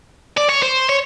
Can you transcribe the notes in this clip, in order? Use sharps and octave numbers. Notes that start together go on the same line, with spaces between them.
D5
C#5
C5
C#5